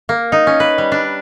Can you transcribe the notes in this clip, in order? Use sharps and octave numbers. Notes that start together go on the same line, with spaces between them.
A#3
D#4
C#4
B4
G3
D4